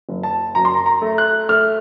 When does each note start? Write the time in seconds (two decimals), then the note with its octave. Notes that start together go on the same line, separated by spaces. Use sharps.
0.09 F#1
0.23 A5
0.55 F#2 A#5
0.65 C6
0.75 A#5
0.86 A#5
1.02 A3
1.18 F#6
1.49 A3 F6